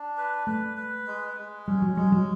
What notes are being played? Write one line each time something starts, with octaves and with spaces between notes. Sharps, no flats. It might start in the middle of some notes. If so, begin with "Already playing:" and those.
Already playing: D4
B4
A3 B4
B4
G#3
G#3
G3 C#4
F#3
G3 G#3
F#3